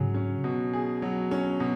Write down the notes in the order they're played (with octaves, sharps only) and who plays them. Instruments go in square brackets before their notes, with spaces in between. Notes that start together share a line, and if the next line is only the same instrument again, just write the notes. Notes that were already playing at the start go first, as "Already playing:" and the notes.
Already playing: [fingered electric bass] G#2 C#3 [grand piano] F#3 G#4
[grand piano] C#4
B2
G#4
F#3
C#4
B2